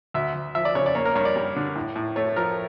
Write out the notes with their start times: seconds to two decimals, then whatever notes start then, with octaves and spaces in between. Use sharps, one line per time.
0.14 D2 E5
0.35 D2
0.55 F3 E5
0.65 D5
0.75 C#3 C#5
0.86 D5
0.95 A#3 C#5
1.05 A#4
1.15 G2 C#5
1.25 D5
1.36 G3
1.56 D3
1.75 A2
1.96 A2
2.16 A3 C#5
2.36 F3 A#4